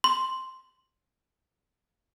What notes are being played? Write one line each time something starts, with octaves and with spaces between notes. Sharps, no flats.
C6